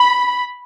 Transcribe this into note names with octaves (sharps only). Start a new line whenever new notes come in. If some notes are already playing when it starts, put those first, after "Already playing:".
Already playing: B5